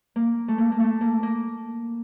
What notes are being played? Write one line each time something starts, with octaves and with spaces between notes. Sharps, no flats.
A#3
A3
A#3
A#3
A3
A#3
A#3